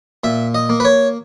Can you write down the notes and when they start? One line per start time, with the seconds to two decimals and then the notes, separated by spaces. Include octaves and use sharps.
0.24 A#2 E5
0.55 D#5
0.70 A#3
0.80 B4
0.85 C#5